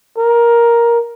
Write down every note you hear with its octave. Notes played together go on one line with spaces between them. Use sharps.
A#4